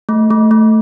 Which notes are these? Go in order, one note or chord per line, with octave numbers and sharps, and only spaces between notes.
A3
A3
A3